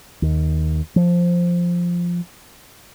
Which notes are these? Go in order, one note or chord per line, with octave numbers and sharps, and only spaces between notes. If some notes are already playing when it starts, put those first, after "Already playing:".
D#2
F3